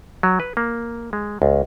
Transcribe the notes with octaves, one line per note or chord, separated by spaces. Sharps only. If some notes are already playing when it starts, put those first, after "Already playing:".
F#3
B4
A#3
G#3
C#2